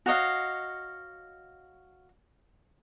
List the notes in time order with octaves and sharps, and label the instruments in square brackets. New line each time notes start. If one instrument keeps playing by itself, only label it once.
[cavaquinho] F#4 C#5 D#5 F5